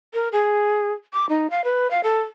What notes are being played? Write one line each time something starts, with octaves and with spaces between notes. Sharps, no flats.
A#4
G#4
D6
D#4
F5
B4
F5
A4